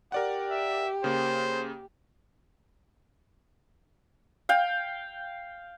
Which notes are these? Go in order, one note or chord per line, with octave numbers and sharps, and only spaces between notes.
G4 A#4 D5 F#5
E5
C#3 A#3 C5
F5 G5